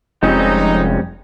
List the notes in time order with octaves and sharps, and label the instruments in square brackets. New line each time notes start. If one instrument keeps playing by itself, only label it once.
[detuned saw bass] F1 [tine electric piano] F2 F3 G3 [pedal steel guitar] G#3 C4 C#4 [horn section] D#4